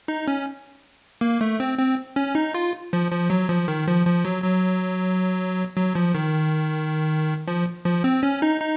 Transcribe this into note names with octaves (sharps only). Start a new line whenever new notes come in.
D#4
C#4
A#3
A3
C4
C4
C#4
D#4
F4
F3
F3
F#3
F3
D#3
F3
F3
F#3
F#3
F#3
F3
D#3
F3
F3
C4
C#4
D#4
D#4